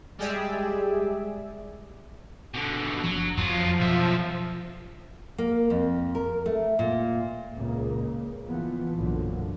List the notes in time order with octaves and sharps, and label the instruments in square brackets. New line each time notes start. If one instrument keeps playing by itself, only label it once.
[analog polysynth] G3 G#3 G4 G#4 D5 E5
[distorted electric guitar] B2 D3
[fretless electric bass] F#1 F3 D4 [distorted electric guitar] F#3
[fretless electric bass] F2 [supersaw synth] F3 [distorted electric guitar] F#3 F4
[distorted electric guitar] B1 E5 [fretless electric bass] B2
[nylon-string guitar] A#3
F2
A#4
A3
A#2
[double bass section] C#2 A#2 C#3 A#3
E3 F3 B3
B1 F#2 A#2 D3 F3